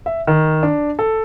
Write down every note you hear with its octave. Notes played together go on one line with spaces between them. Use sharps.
E5
D#3
D4
A4